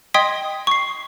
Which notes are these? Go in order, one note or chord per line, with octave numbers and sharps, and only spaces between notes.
D#5 G5 C6 D#6 G#6 B6
C#6 C7